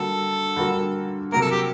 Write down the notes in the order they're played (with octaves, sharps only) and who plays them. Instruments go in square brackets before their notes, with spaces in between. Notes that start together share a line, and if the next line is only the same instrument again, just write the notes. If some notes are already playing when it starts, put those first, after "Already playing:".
Already playing: [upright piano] D3 G3 A#3 F#4 [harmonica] A4
[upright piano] D3 G3 A#3 F#4
[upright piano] C3 F#3 A#3 [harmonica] A#4
[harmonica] A4
G4